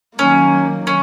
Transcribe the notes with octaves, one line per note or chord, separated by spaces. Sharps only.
D#3 F#3 A#3 C#4
C#4